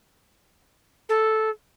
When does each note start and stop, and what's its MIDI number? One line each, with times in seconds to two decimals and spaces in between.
1.09 1.49 69